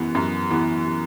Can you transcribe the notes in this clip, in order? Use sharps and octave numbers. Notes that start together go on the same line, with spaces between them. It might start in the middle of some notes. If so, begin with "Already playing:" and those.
Already playing: F#2 E3 B3
F#2
E3 B3